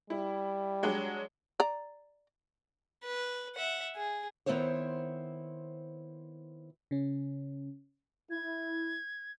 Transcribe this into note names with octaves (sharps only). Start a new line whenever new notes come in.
G3 E4
F#3 G#3 D4
D5 A#5
B4
E5 F#5
G#4
D#3 B3 C4 E4 C5 C#5
C#3 C#4
E4 G#6